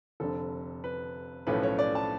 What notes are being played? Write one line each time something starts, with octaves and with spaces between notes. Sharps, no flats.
F1 F2 D3 A4
B4
B1 A2 F3 A3 C#4 B4
C#5
D5
A5